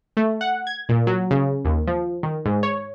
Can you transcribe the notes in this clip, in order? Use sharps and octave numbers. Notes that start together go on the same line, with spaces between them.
A3
F#5
G#6
A#2
F#3
C#3
D#2
F3
D#3
G#2
C#5